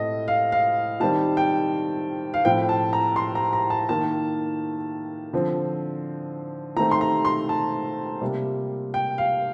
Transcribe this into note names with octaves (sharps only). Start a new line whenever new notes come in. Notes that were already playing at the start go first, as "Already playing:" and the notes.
Already playing: A2 A3 C4 D#5
F5
F5
D#3 G3 C4 A5
G5
F5
A2 F3 C4 G5
A5
A#5
C6
A#5
A#5
A5
D#3 A#3 A5
D3 F3 C4
D#3 A3 C4 A#5
C6
A#5
C6
A5
C3 G3 A#3
G5
F5